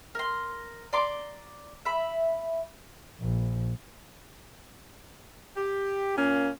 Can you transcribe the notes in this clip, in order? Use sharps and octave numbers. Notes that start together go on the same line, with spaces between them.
A#4 C6
D5 A#5 C6 D6
E5 B5
A#1
G4
A#2 A#3 C#4